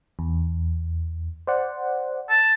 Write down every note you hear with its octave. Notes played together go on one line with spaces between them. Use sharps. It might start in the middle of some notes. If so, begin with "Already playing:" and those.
E2
C5 D5 F#5
A5